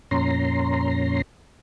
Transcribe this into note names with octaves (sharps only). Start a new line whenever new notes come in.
F2 A#2 C#4 A#5 C6